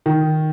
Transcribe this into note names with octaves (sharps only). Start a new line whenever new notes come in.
D#3